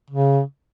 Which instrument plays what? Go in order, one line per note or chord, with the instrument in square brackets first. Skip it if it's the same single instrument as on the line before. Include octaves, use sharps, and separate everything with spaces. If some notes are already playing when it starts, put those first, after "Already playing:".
[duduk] C#3